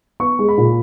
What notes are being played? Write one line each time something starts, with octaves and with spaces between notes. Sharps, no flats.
B3 C#6
G#3
B5
A#2